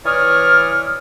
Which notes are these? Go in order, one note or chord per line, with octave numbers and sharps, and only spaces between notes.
E3 C#5 D5 D#6 F6